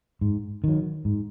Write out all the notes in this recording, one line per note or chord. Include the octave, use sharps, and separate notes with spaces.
G#2
D#3 F#3
G#2